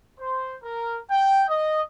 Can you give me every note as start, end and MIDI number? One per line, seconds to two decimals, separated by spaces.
0.20 0.57 72
0.63 0.98 70
1.10 1.45 79
1.49 1.82 75